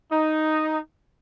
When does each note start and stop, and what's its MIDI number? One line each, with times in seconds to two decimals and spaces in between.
0.11 0.78 63